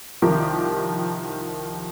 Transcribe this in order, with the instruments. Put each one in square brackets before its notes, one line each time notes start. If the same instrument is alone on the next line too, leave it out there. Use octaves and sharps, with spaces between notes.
[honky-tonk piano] C2 D#3 F3 G4 A#4 D6